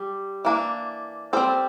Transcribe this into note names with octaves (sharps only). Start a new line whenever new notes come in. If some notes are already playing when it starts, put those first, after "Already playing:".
Already playing: G3
E3 A#3 D4
G3 C4 A4 C5